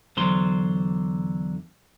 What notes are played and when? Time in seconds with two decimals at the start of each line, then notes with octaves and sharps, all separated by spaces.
0.17 E2 D3 F#3 C5 C6